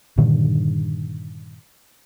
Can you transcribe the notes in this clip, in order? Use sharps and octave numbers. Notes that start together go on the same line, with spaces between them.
G2 A#2 D3 D#3